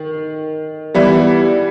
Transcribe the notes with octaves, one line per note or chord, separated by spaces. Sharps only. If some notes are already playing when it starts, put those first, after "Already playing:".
Already playing: D#3
E3 G3 B3 E4